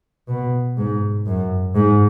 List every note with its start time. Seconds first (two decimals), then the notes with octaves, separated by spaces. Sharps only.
0.28 B2
0.77 G#2
1.26 F#2
1.75 G#2